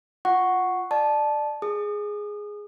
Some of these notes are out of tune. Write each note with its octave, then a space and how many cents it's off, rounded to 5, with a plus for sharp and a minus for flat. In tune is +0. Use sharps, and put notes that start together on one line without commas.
F4 +0 F#5 +0 C#6 +0
D5 +20 A5 -15
G#4 +0 D#6 -30